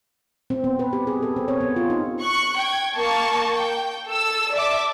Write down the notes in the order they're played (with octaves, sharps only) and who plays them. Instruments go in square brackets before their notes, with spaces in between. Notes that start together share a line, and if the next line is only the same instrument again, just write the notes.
[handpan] C4
B3
B4
G4
G#4
A4
C4
C#5
B3
F4
D#4
[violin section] C#6 F#6 C#7
G5 G#6
A#3 A5 C#6
G5
A4 E6
D5 E5 A5 D6